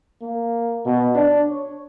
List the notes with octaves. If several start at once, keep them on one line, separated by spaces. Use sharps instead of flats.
A#3
B2
D4
C#5